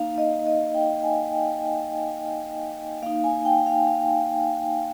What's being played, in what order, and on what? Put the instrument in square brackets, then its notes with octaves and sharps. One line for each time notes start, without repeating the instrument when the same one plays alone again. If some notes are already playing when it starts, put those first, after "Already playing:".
Already playing: [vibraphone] A#3 D#4 F5
D#5
D#5
G5
G#5
G5
A#3 F5
D#4
G#5
G5
F5
F5